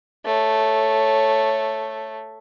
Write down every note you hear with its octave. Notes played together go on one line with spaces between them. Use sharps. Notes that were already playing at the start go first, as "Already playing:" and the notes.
A3 C#5